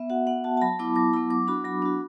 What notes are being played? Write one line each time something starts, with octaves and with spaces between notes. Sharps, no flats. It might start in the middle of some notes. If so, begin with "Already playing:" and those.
Already playing: B3 E5
F#4 F#5
B3 F#5
F#4 A5
A5
F#3 B5
B3 E4 D6
F#3 D6
B3 E4 B5
F#3 D6
D4 F#4 B5
F#3 B5
D4 F#4 B5